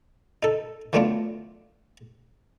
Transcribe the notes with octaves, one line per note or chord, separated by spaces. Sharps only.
D#4 A4
E3 F#3 A3 B3 D4 F4